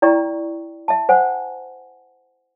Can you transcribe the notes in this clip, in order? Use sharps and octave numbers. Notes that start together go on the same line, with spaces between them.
E4 D5 G5 A#5 C#6
E5 A5
C5 F#5 G#5